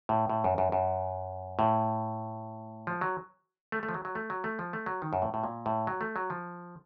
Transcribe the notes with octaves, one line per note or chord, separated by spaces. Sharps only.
A2
A2
F#2
F#2
F#2
A2
F3
F#3
A3
A3
F3
F#3
F#3
A3
F#3
A3
F3
A3
F#3
D#3
F#2
A2
A2
A#2
A2
F#3
A3
F#3
F3